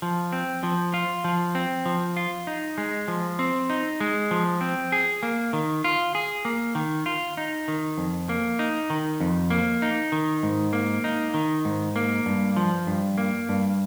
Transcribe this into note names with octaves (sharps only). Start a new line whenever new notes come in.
F3
C4
F3
F4
F3
C4
F3
F4
D#4
G#3
F3
C4
D#4
G#3
F3
C4
G#4
A#3
D#3
F4
G#4
A#3
D#3
F4
D#4
D#3
F2
A#3
D#4
D#3
F2
A#3
D#4
D#3
G#2
A#3
D#4
D#3
G#2
A#3
G2
F3
G2
A#3
G2